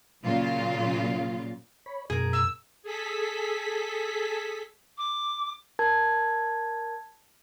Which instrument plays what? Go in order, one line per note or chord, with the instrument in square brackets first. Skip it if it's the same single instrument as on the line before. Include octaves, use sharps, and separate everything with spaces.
[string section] A#2 C#3 F#3 F4
[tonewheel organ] C#5 B5
[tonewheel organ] F#2 B2 [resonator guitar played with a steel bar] G#4 A#4
[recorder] E6
[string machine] G#4 A4 B6
[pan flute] D6
[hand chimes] A#4 A5 G#6